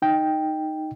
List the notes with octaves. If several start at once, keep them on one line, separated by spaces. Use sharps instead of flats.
D#4 G5